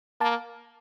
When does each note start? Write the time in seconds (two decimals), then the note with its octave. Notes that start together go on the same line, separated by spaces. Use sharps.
0.20 A#3 A5